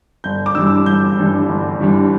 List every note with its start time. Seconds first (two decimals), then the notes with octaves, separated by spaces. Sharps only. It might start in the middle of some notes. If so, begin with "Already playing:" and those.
0.24 G1 G6
0.46 D6
0.55 G2 E3 G3 D4 E6
0.86 G1 G6
1.18 G2 E3 G3 D4
1.49 G1
1.80 G2 E3 G3 D4